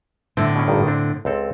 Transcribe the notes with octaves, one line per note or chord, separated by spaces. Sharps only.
A2 D3 C4 E4
B2 C#4
G#1 G2 D#3
C4 D4
C#2 C4 A4